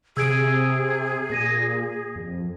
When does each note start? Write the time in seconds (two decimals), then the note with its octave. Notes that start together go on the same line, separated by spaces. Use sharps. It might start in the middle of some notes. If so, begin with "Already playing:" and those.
0.17 C3 G#4 E6 G#6 D7
1.30 A#2 G#6 A#6 D#7
1.45 A#6
2.16 F2